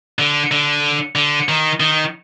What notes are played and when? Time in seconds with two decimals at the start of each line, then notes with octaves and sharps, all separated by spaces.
0.19 D3
0.51 D3
1.15 D3
1.49 D#3
1.80 D#3